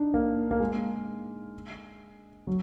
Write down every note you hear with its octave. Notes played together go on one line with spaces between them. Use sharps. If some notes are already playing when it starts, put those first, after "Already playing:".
Already playing: D4 D#4
A#3
A#3
G#3
F#3